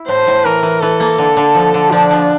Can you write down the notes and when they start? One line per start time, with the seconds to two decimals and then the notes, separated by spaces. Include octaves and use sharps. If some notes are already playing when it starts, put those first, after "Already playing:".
Already playing: E4
0.08 A2 C5
0.27 A2
0.45 E3 A#4
0.63 E3
0.81 E3 A4
1.00 A#3
1.18 D3
1.37 D3
1.55 F3
1.74 D3
1.92 F3 D4
2.11 F3